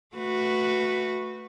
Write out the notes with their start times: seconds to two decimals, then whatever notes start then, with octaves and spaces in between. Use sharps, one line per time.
0.16 A3 F#4 B4